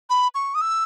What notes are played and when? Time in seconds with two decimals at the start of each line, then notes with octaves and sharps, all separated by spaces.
0.10 B5
0.35 C#6
0.55 D#6
0.61 E6